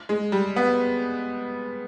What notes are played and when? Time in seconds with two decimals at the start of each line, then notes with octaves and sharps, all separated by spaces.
0.09 G#3
0.32 G3
0.56 B3